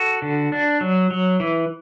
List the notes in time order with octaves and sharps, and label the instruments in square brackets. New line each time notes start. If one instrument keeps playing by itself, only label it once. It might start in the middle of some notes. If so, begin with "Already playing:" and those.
Already playing: [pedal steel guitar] F#4 A4
D3
D4
F#3
F#3
E3